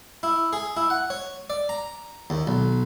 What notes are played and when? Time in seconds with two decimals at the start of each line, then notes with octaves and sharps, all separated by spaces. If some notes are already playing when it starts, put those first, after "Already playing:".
0.23 E4
0.53 G#4
0.77 E4
0.90 F#5
1.10 C#5
1.50 D5
1.69 A#5
2.30 D#2
2.47 B1